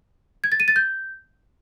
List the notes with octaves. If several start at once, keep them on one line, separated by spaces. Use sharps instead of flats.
G#6
A6
D#7
A6
G6